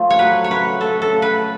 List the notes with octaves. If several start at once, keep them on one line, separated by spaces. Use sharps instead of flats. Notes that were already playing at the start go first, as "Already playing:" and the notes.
Already playing: F3 A3 F4
C#5
F#3 B4
C#5
C#3 B4
A3 A4
A4
C#3
B4